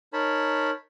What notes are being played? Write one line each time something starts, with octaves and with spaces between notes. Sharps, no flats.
D#4 A#4 C#5 A5 B5